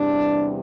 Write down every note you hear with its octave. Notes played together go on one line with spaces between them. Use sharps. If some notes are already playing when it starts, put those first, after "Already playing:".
Already playing: E2 C3 G3 D4